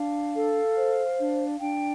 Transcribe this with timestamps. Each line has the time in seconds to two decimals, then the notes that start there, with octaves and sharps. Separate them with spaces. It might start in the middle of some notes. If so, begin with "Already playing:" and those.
Already playing: D4 F5
0.35 A4
0.77 C5
1.19 D4
1.61 D4 G5